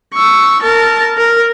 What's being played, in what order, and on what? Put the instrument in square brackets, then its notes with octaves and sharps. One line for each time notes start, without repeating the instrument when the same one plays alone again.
[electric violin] C#6 E6
A#4 A5
A#4